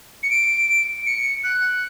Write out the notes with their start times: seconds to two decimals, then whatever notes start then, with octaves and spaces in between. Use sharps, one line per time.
0.23 C#7
0.30 D7
1.06 C#7
1.44 F#6